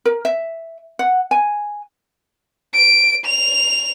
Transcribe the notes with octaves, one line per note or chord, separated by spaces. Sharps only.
A#4
E5
F#5
G#5
D7
F7